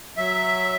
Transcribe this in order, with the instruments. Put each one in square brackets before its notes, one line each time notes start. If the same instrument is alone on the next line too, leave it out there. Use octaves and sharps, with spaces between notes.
[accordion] F#3 E5